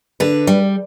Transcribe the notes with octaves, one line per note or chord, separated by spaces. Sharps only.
D3 B4
G3